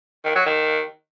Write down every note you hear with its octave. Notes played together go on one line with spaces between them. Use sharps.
D#3
F#3
D#3